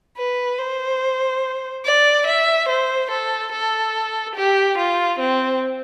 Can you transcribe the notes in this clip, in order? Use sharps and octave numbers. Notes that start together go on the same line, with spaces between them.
B4
C5
D5
E5
C5
A4
A4
G4
F4
C4